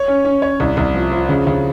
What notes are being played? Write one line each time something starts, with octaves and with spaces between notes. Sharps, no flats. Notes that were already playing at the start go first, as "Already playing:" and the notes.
Already playing: C#5
C#4
C#4
C#5
C2
C2
F3
F3
C#3
C#3